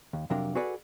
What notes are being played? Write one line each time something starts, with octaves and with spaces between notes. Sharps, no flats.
D#2
F2 C3 F#3 D4 A#4 F5
F#4 G#4 A4 B4 D5 F#5